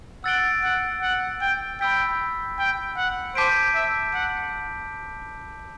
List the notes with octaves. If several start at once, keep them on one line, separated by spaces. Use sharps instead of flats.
F#5 E6 A6 D7 G7
F#5
F#5
G5
G5 B5 E6 B6
G5
F#5
C5 A5 D6 G6 B6 D7
E5
F#5